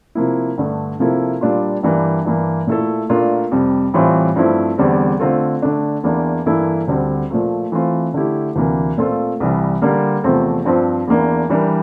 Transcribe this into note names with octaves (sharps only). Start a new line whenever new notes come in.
C3 F3 A#3 E4
G2 D3 A3
C3 F3 A#3 E4 A4
A#2 G3 D4 F4
G2 E3 G3 A#3 D4
G2 E3 A#3
A#2 A3 E4 A4
A#2 A3 D4 F4 A#4
F2 C3 G3
A2 E3 G3 C4 F4
G2 F3 A3 C4 E4
E2 D3 G3 C4
D3 A3 C4 F4 A4
D3 A3 D4
E2 E3 A#3 D4
G2 E3 A#3 E4 A4
D2 D3 G3 C4
A#2 F3 A3
E3 A3 C4 F4
D3 A3 E4 G4
D2 C3 E3 A#3
A#2 A3 C4 F4 A4
C2 C3 E3 G3
D3 G3 A#3
E2 C3 F3 A3 C4
G2 F3 C4
E2 E3 A#3 D4
E3 G3 D4 G4 A#4